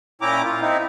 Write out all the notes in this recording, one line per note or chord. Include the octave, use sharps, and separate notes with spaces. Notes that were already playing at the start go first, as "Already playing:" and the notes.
A#2 C#4 E4 G5 A#5 D6
F4
C4 D#4 E4